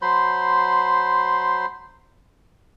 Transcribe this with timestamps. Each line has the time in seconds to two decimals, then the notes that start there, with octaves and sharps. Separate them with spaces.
0.02 F#3 C5 B5 C6